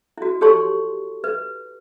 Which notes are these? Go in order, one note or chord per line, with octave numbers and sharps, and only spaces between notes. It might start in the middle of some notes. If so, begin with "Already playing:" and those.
E4 F#4
G4 A4 C#5 A5 C6 C#6
B4